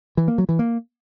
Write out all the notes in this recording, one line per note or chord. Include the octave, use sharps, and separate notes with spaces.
E3
A#3
F#3
E3
A#3